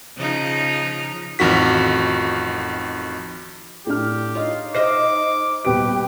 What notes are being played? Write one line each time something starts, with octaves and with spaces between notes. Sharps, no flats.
C#3 F3 D#4
A1 F2 D#3 F#4 B6
A2 D4 G4 F6
D#4 F4 C#5 D#5
C5 D#5 E5 D6 F6 A#6 C7
D#1 B2 G4 B4 D#6 D7